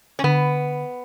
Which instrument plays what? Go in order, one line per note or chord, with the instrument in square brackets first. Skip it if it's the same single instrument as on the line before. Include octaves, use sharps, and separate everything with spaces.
[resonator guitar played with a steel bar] C#4
[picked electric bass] D3 [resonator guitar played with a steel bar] B3